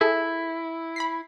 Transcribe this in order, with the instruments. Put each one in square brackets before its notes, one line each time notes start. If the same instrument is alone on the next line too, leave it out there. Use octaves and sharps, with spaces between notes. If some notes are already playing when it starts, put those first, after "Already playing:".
[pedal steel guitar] E4 [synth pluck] G#4 A4 E5
[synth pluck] B5 B6 C7